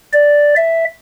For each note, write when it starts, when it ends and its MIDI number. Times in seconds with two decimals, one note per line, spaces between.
0.13 0.55 74
0.56 0.84 76